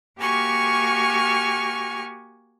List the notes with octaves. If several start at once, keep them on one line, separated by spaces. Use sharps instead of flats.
A#3 F#4 G4 G#5 C#6 F6